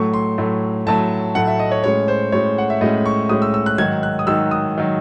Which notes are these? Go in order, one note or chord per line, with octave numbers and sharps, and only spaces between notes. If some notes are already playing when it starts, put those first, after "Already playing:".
Already playing: A2 F#3 A3 C#6
C6
A2 F#3 A3
A2 F#3 A3 A5
A2 F#3 A3 F#5
E5
D#5
C#5
A2 G#3 C#4 C#5
C5
A2 G#3 C#4 C#5
F#5
E5
A2 G#3 C#4 D#5
C#6
A2 G#3 C#4 D#6
E6
E6
F#6
G#2 D#3 F#3 G#6
F#6
D#6
G#2 D#3 F#3 E6
D#6
D#3 F#3